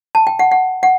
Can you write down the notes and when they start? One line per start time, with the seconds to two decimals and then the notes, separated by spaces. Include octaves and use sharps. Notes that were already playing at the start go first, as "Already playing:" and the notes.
0.15 A5
0.27 G5
0.39 F#5
0.52 F#5
0.83 F#5